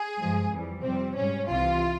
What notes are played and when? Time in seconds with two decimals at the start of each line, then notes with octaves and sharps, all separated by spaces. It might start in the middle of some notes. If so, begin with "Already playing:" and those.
Already playing: G#4
0.18 G2 F3 G#3
0.51 F2 E3 G3
0.84 F2 C3 G3 C4
1.16 G#2 G3 C#4
1.49 C2 C3 E3 F4